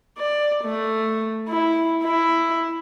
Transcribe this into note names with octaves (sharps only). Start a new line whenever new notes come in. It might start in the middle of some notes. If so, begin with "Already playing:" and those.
D5
A3
E4
E4